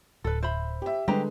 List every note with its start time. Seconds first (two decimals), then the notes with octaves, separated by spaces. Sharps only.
0.24 D1 A4 B4
0.43 C5 E5 B5
0.82 G4 E5
1.08 D3 G3 G#3 G4 B4 C5 A#5